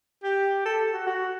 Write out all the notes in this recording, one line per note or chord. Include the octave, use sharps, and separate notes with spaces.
G4
A4
F#4
F#4